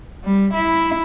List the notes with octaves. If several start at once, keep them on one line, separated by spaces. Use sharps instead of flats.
G3
E4